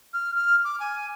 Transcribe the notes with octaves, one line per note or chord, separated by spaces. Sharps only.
F6
F6
D6
G#5